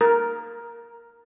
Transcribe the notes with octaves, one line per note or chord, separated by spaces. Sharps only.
A#4